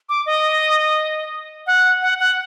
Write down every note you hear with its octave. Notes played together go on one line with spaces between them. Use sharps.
D6
D#5
F#5
F#5
F#5